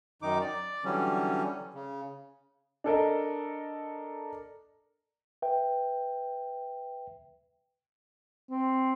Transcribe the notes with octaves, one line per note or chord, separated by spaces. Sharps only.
F#2 D#3 D#4 D6
D5
D3 E3 F#3 G3 C#4
C#3
D4 A4 A#4 D#5
B4 E5 G5
C4